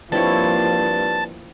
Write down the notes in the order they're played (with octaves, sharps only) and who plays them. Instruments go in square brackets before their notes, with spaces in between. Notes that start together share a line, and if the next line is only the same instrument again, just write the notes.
[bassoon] G2 [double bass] F3 A#3 [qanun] C4 E4 C#5 [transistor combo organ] A5